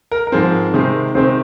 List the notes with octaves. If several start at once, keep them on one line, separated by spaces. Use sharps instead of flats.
A#4
A#4
G#2 F3 G#3 C4
C3 D#3 G#3 C4
C3 D#3 G#3 C4 C5